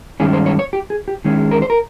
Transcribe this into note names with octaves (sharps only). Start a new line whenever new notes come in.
G2 D#3 G#3 C#4 G#4
C5
C#5
C#5
G4
G#4
G4
D#3 G#3 C#4 G#4
A#4
C5
A#4